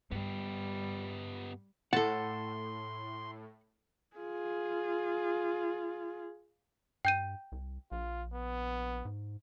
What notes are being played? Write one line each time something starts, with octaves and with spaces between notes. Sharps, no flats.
G2 G3 B3 G4
A2 A4 F#5 A5 C6
F4 G#4
G2 G5 G6 D#7
C2
A#1 F4
B3
G#2